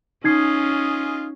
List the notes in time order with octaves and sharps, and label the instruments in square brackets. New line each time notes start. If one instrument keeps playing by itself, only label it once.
[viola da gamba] C#4 [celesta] D#4 G#6 C7 [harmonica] F4 G#4 D#5